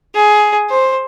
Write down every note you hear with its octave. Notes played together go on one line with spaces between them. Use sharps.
G#4
C5